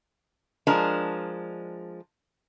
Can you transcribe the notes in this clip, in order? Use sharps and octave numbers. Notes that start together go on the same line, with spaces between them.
F3 G#3 D4 A#4 A5